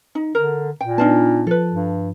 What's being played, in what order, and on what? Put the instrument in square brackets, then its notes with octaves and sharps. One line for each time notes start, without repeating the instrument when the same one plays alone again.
[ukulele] D#4
[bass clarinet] D3 [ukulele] A#4
[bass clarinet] A#2 [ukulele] G5
[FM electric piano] B3 D4 [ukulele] D#4 F4 A5
[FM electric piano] F3 [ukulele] A4 B4
[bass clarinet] G2